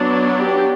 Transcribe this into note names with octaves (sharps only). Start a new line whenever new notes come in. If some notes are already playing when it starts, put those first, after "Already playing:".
Already playing: F#3 B3 D4
G4